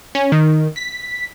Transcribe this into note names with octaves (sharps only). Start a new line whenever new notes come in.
C#4
D#3
B6